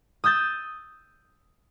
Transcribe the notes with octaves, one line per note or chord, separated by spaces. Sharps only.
D#6 E6 G6 A6